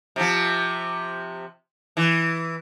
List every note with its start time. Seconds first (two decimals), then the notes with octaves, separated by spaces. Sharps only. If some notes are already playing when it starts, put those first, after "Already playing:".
0.16 C3 F3
1.97 E3